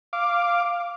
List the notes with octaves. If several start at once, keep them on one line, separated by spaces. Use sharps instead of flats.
F5 D6